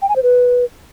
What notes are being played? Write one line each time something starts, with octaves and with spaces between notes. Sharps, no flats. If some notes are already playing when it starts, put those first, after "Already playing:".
G5
G#5
C5
B4